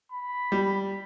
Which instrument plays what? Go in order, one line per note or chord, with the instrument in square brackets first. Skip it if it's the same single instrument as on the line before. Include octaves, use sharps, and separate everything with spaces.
[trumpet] B5
[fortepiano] G3